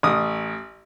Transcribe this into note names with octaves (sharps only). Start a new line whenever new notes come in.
A1 D#6